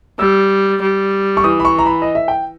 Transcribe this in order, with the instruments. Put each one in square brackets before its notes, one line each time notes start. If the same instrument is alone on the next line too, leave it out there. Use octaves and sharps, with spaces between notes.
[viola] G3 [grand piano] E6
[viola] G3
[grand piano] C#6
[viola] E3 [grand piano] D#6
[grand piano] B5
C#6
A#5
B5
D#5
E5
G5